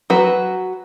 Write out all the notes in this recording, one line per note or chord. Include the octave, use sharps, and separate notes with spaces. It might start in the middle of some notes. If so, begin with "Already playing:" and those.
F#3 F#4 B4